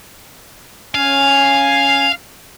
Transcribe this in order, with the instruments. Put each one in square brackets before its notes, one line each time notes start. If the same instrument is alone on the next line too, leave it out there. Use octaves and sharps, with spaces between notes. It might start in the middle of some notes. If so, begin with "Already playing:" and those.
[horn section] C#4 G#5 [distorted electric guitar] F5